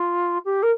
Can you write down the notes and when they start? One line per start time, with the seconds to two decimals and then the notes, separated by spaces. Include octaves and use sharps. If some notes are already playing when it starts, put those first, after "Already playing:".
Already playing: F4
0.45 G4
0.62 A#4